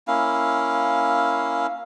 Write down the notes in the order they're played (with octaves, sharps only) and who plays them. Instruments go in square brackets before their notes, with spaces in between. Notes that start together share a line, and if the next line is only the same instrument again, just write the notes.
[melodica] A#3 C#4 E4 F5